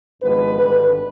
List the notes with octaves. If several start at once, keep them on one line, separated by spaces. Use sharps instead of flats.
G#1 G2 F3 G#3 B3 B4
G#1 G2 D3 B4